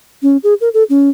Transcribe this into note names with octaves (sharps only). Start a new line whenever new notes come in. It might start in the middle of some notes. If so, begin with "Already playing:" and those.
C#4
G#4
A#4
A4
C#4